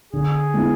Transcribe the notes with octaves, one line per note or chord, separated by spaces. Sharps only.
D3 G#4
G#3 B3 E4